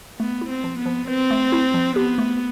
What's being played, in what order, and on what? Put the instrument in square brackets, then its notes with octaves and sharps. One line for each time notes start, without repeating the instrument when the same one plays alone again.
[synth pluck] A3 [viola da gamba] B3
[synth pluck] E4
[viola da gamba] C4
[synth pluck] F3
[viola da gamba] B3
[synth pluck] F3
[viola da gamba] C4 [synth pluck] B4
[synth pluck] A3
E4
F3
[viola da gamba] B3 [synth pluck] G4
[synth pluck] A3